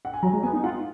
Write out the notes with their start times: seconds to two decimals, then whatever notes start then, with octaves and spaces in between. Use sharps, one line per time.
0.05 F#5
0.13 G#5
0.23 F#3 A#5
0.33 G#3
0.43 B3 G#5
0.53 D#4
0.63 F4 F#5